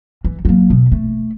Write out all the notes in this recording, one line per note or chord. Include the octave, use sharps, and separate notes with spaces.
E3
F#3 A#3
B2
A3